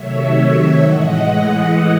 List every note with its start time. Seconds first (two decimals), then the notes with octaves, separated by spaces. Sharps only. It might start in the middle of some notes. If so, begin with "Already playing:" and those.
Already playing: C3 D#3 F#3 A3 C#5 E5
0.83 A2 E3 G#3 D#5 F#5